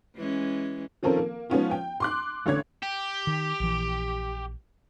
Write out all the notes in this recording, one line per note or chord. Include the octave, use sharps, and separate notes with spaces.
E3 G#3 C#4
D#3 F3 C4 C#4 A4 A#4
A#3
F3 G#3 B3 C#4 D#4 F4
G5
C6 D6 F#6
A1 D3 C#5 G#6
G4
D#3
A#1 E3